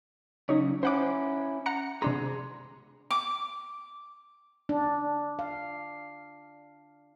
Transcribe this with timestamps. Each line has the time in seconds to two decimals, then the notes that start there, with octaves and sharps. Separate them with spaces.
0.49 C#3 F#3 D#4 C#5
0.83 C#4 E4 C5 F#5 D6
1.66 F#5 A#5 C#7
2.02 C3 D4 G#4 A#5 C6
3.11 D6
4.69 D4
5.39 F5